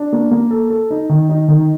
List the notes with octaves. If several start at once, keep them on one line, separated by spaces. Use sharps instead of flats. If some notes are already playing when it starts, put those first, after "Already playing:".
Already playing: D4
A#3
A#3
A4
A4
D#4
D#3
D#4
D#3